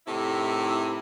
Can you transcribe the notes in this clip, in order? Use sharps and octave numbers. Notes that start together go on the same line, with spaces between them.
A2 C3 D#3 E4